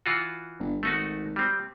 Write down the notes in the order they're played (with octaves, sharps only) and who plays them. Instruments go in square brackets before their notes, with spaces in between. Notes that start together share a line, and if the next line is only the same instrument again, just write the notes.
[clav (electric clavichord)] E3 F4 F#4
[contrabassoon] G1
[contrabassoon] G#1 [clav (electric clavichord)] A3 D#4 F#4
[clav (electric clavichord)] G3 C4